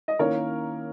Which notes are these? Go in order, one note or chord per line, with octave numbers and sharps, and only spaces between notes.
D#5
D#3 A#3 C#4 E4 A#4 C#5